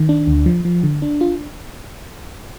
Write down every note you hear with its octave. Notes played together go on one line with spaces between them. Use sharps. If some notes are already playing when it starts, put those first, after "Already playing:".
Already playing: D#3
D4
D2
F3
F3
D3
D4
F4